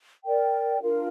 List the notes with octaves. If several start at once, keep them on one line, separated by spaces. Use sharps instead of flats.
A#4 D5 G5
D4 F4 A#4 F5